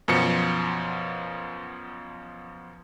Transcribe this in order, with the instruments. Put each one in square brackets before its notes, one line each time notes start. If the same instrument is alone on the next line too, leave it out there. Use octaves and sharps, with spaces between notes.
[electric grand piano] F#2 B2 F3 C#7